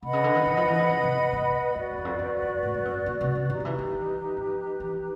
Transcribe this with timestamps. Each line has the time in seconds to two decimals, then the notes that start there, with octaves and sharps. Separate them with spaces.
0.02 C3 B4 D#5 F#5 B5
0.13 C#3
0.24 D3
0.35 D#3
0.46 E3
0.57 F3
0.68 E3
0.79 D3
0.89 C#3
1.03 C3
1.33 A#2
1.76 E2 F#4 B4 D5
1.91 F2
1.98 E2
2.05 F2
2.19 F2
2.42 F2
2.63 A2
2.74 G2
2.85 F#2
3.06 A#2
3.21 C3
3.35 C#3
3.50 D#3 D#4 G4 B4
3.60 D#3
3.65 E3
3.78 E3
3.94 E3
4.37 F3
4.80 E3